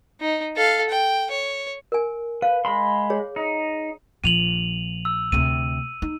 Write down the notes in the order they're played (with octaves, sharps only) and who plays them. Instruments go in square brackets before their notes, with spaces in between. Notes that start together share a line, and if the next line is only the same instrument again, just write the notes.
[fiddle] D#4
A4 F5
G5
C#5
[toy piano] A#4 G#5
[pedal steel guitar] B4 [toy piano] F5
[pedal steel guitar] G#3 B5 C6
[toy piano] G#4 C#5
[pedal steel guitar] D#4
[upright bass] A#1 F3 [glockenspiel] D#7 F7 F#7
[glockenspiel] E6
[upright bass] D2 C3 [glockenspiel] D#7
[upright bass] D#4